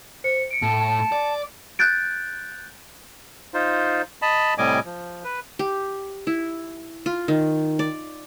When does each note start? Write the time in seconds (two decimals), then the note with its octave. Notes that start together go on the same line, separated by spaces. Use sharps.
0.24 C5 C#7
0.51 C#7 D7
0.62 A2 A5
1.12 D5
1.79 F#6 G6 A6 D7
3.54 D#4 F4 C5
4.22 D#5 A5 B5
4.58 A2 C3 G3 D#5 G#5 D6
4.85 F3
5.24 B4
5.59 G4
6.27 E4
7.06 F4
7.28 D#3
7.79 D5